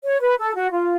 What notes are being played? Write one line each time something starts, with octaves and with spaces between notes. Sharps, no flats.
C#5
B4
A4
F#4
F4